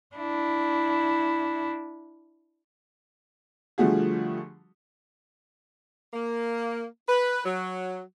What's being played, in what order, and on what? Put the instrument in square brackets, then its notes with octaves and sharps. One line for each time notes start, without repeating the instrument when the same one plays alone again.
[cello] D4 E4
[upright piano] D3 F3 G3 A3 F#4 G#4
[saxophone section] A#3
B4
F#3